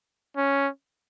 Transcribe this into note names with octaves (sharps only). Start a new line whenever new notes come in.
C#4